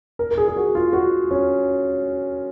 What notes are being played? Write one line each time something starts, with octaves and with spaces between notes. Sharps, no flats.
A#4
A#4
G#4
G#4
F#4
F4
F#4
C#4